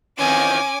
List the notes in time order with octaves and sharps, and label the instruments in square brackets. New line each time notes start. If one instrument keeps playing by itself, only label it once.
[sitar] F2 D#3 E3 [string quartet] C#4 D6 [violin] G#5